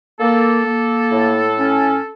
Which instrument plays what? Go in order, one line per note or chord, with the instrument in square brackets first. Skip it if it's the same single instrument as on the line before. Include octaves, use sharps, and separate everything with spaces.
[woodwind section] A#3 A4
A#3
A2
C#4